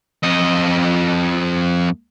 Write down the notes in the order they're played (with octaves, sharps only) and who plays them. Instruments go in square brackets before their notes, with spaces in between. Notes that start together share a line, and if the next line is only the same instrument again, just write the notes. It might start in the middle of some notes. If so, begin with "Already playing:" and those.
[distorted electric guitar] F2 D#5